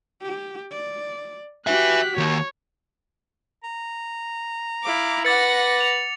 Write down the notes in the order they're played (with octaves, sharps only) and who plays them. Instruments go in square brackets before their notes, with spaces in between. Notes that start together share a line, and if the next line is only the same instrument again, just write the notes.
[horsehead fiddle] G4
D5
[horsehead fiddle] F#4 G4 [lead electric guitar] B4 E5 [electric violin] F#6 B6
[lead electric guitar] D#3 A#3 [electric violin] C#5
[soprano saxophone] A#5
[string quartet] E4 F5 D6
[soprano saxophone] B4 [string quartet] F#5 A#6 [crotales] D6 A6 C#7
[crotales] F7